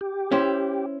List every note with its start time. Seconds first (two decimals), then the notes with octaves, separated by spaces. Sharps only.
0.01 G4
0.32 C#4 E4 C5